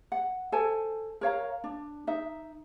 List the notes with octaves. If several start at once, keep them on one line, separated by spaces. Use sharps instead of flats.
F#5
A4 C5 G#5 A5
A#4 C#5 F5 A#5
D4
D#4 E5